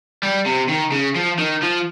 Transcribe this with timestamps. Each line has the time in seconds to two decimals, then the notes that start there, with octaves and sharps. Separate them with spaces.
0.23 G3
0.46 C3
0.69 D#3
0.92 C#3
1.16 F3
1.39 D#3
1.63 F3